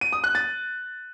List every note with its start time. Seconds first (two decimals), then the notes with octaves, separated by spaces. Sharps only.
0.01 D#7
0.13 D#6
0.24 F#6
0.35 A6